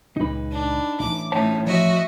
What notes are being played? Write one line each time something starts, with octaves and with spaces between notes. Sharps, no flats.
C#2 A#2 D#4 B4
D4
A1 D6
A2 C#4 D#4 C5 C#5 A5
F3 F#4 C#5 D#5 E5